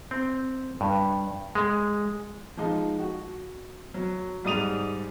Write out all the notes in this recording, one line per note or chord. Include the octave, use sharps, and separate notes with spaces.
C4
G2
G#3
F3 G#3 D#4
F#4
F#3
G#2 G3 D5 D#6 D#7 F7